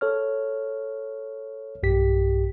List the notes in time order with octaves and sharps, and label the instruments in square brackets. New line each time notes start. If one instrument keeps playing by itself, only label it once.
[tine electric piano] A4 C#5 F6
B1 G2 G4 B6